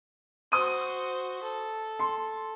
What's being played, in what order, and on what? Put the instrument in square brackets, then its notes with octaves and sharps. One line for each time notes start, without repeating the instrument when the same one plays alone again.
[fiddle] F#4 C5 [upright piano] D#6 D#7
[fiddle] A4
[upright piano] C6